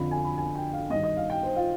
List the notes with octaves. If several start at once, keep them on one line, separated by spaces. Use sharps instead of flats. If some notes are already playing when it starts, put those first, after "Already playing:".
Already playing: F2 D3 F3 B5
G#5
B5
G#5
G5
F5
G2 D#3 D#5
D#5
F5
G5
C5
F4